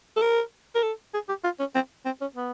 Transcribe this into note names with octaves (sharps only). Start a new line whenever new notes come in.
A4
A#4
A#4
A4
G#4
G4
F4
C#4
C4
C4
C#4
B3